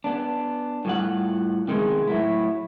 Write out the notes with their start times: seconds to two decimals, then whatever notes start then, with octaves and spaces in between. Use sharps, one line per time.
0.04 B3 D4
0.85 A2 G3 F4 F#5
1.68 C3 D#3 G#3 B3
2.07 A2 F#3 E4